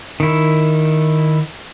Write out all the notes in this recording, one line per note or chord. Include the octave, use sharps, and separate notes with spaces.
D#3 E4